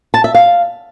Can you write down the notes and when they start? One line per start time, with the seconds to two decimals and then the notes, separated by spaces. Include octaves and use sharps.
0.14 A5
0.24 E5
0.34 F5